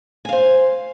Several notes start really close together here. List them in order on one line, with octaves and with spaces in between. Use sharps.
G#5 F5 C5